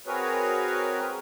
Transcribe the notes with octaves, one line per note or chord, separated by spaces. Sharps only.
C4 F#4 G#4 A#4 B4 C#5